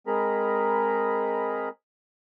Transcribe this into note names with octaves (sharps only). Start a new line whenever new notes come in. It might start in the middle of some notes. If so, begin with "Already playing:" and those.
G#3 C4 G#4 A#4 A#5 B5